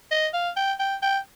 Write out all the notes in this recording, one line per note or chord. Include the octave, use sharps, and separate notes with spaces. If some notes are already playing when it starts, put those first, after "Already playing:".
D#5
F5
G5
G5
G5